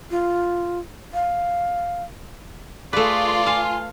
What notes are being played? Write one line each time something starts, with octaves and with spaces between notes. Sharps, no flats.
F4
F5
A3 F4 G#4 B4 D5
F5 G#5